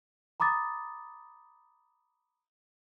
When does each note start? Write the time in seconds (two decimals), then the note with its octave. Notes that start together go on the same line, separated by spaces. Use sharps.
0.40 A#5 B5 D6 D#6 A6